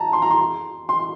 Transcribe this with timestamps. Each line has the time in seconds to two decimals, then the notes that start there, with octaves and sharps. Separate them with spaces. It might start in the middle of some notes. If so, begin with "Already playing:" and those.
Already playing: A5 A#5
0.13 C6
0.22 A#5
0.31 C6
0.89 C6